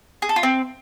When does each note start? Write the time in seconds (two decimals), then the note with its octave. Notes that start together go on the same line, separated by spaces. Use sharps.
0.22 G#4
0.29 A4
0.36 F4
0.43 C4